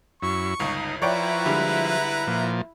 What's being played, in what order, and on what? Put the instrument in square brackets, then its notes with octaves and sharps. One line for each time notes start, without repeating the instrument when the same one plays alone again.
[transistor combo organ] F#2 E4 [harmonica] C#6
[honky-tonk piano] G1 C#2 [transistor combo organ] D#4
[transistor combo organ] F3 [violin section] E4 [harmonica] B4 F#5 A#5 [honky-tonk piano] C#5 D5 G5
[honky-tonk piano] D3 G3 G#3
[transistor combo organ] A#2 F3